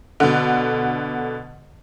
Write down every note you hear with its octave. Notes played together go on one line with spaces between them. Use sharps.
B2 D3